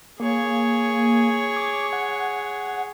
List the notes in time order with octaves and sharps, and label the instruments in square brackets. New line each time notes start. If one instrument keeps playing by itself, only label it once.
[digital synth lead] A#3 [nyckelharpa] G#4 C#5
[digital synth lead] D6
F#5